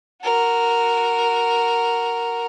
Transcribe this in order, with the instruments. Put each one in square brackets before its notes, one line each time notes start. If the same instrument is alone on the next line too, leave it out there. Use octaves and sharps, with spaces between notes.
[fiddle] F#4 A#4